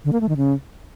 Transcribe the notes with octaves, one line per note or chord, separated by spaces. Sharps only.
D3
A#3
A3
D#3
C#3